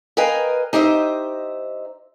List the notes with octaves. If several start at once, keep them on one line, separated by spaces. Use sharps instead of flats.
A#4 B4 D#5 F5 G5 G#5
D#4 G4 C5 D#5 E5